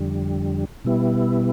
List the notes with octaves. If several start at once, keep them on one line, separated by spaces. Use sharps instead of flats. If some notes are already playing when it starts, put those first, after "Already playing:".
Already playing: F2 D3 G3
B2 G3 B3 E4